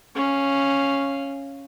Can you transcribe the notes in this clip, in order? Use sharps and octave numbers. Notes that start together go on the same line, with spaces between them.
C#4 F5